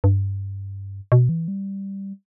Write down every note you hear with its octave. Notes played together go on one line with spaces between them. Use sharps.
G2
B2
E3
G3